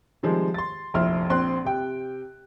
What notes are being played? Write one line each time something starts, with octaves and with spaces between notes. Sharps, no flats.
C3 D#3 F3 G3 G#3
C6 A6
F1 A#1 E4 C6 F6
A#1 C4 C6 F#6
C3 G5